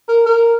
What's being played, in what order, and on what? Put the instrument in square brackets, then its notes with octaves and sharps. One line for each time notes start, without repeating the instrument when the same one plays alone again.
[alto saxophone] A#4
A#4